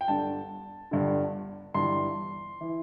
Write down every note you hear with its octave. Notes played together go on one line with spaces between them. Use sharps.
G5
G1 G2 D3 A5
G1 G2 D3
G1 G2 E3 C6
E3